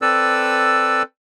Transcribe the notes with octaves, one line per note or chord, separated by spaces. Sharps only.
C4 A4 B4 D5 E6